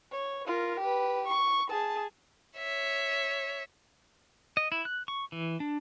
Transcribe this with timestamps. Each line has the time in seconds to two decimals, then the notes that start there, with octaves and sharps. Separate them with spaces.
0.11 C#5
0.46 F4 A#4
0.80 G4 B4
1.27 C#6
1.70 G#4 A5
2.57 C#5 E5
4.57 D#5
4.72 E4
4.85 F#6
5.08 C#6
5.32 E3
5.60 D4